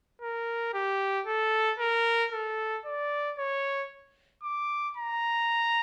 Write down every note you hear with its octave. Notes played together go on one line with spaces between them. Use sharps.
A#4
G4
A4
A#4
A4
D5
C#5
D6
A#5